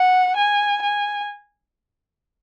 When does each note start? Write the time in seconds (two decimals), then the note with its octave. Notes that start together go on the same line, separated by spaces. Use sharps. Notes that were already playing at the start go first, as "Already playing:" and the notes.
Already playing: F#5
0.37 G#5
0.82 G#5